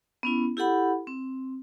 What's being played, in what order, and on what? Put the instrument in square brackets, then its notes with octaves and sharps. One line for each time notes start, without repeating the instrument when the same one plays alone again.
[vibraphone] B3 C#4 E4
E4 G4 A4 F#5 B5
C4